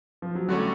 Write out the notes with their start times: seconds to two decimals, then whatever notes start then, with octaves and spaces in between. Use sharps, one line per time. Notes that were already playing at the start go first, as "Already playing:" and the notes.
0.22 F3
0.35 F#3
0.48 D3 F#3 G3 A3 C#4 F#4